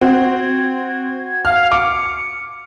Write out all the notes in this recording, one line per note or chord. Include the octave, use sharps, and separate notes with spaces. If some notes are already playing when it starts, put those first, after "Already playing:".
C4 F#4 G#6
F5 F6
D6 C#7